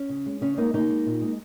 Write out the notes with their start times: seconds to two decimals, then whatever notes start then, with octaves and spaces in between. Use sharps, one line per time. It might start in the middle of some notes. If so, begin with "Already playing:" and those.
Already playing: C#4
0.09 C#3
0.26 G#3
0.41 C#3 C#4
0.57 G#3 A#3 D#4
0.73 C#3 A#3 D#4
0.89 G#3
1.06 A#2
1.22 G#3